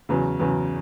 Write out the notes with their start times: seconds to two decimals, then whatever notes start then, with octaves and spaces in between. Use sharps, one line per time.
0.09 E2 C#3 F#3
0.40 E2 C#3 F#3